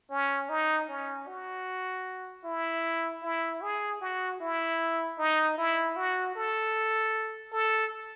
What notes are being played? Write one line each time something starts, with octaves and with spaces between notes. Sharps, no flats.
C#4
D#4
C#4
F#4
E4
E4
G#4
F#4
E4
D#4
E4
F#4
A4
A4